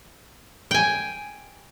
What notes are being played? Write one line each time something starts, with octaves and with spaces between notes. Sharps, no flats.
G5 G#5